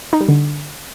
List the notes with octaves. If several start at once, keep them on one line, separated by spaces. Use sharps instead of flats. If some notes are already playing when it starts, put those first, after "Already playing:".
D#4
G3
D3